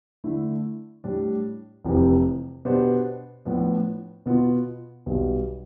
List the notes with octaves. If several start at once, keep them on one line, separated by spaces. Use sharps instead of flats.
D3 A3 E4
A2 G3 D4
F1 F2 C3 E3
B2 B3 D4 G4 C5
A2 F3 B3 D4
B2 B3 F4
B1 B2 G3